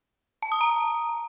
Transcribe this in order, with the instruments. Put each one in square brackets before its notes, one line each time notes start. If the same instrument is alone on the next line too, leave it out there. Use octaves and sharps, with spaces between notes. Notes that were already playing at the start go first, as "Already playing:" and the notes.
[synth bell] A5
D#6
A#5